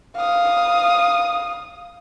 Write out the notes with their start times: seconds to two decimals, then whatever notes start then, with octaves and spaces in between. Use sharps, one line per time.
0.16 F5 D#6